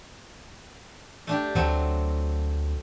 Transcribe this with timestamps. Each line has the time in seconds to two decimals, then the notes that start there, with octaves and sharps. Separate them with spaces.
1.27 A3 D4 G4
1.55 D2 F#3 A3 C4